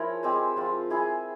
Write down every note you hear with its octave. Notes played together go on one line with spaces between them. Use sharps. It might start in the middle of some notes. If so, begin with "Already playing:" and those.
Already playing: F3 E4 G#4 A#4 C#5
G#3 C4 G4 C5
F3 C4 F4
E4 G#4 E5